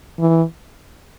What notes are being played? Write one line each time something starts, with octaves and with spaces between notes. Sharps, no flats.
E3